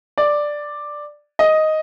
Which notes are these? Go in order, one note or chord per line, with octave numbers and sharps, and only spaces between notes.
D5
D#5